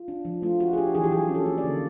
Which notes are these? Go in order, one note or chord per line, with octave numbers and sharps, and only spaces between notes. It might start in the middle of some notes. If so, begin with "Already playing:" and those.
Already playing: F4
D4
F3
A3 F4
F4 F#4
G#4
D4 G4
E3 G#4
G4
F#3 G#4
C#4
A4
A#3
D5
D3